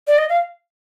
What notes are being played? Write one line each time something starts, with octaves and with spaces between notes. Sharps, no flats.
D5
D#5
F5